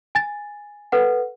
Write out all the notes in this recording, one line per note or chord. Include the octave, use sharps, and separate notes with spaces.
G#5 A6
A4 B4 F#5